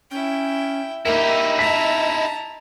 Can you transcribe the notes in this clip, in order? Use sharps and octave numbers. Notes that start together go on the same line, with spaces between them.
C#4 E4 G5
A#3 D#4 E4 G4 A#4 E5
A5 A#5 B6